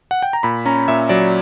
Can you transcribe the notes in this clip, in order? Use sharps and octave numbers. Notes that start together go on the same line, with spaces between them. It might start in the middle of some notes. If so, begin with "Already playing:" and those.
F#5
G5
A#5
A#2 B5
C#4 A#5
A#2 E5
F#3 D5